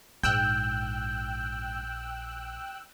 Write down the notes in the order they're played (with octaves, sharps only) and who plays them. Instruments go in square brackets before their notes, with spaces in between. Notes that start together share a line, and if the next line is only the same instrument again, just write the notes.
[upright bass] A#1 [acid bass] G#2 [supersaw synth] G5 E6 F#6 [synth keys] G6